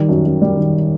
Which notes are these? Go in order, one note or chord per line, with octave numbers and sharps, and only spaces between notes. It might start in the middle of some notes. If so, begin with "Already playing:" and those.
Already playing: D#3 G3
F#2
F#2
G3
D#3